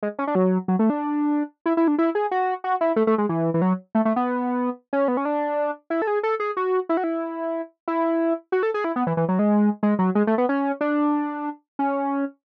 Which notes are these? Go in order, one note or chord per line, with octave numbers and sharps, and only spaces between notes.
G#3
C#4
D4
F#3
F#3
A3
D4
E4
E4
D4
E4
G#4
F#4
F#4
E4
A3
A3
G#3
E3
E3
F#3
A3
A3
B3
C#4
B3
C#4
D4
E4
A4
G#4
A4
G#4
F#4
E4
F#4
E4
E4
F#4
A4
G#4
E4
B3
E3
E3
F#3
G#3
G#3
F#3
G#3
A3
B3
C#4
D4
C#4